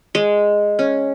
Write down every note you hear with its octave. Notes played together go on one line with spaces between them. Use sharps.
G#3
C#4